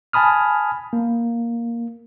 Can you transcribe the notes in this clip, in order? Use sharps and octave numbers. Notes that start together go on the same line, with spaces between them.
G#5 A5 B5 D#6 F6
A#3